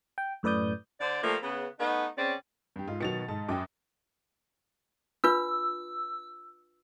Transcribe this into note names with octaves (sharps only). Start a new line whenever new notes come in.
G5
F#2 A2 B4 D5 D#6 G6
D3 C5 D5
F3 G3 A3 A#3
C#3 B3
A3 B3 D#4
C#3 C4 C#4 D5
G2 G4
G#2 F4
B2 D#3 F#3 A6 C#7 F7
G#2 A5
F#2 G5 D6 D#6
D4 F4 B4 E6